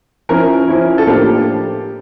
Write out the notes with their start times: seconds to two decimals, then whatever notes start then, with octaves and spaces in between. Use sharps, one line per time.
0.29 F3 C#4 E4 A#4
0.68 F3 C#4 E4
0.98 A4
1.07 A2 F3 A#3 D4 F4 G4